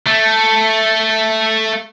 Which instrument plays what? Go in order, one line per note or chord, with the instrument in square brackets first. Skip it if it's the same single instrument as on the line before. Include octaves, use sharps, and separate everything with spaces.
[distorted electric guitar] A3